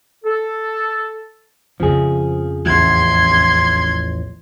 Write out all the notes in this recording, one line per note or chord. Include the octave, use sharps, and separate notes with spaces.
A4
F2 C#3 F3 G#4
A1 E2 C6 G#6